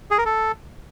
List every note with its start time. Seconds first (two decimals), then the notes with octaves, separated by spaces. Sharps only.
0.11 G#4
0.18 A#4
0.25 A4